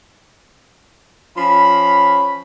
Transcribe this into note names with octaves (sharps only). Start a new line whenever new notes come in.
F3 C#4 B5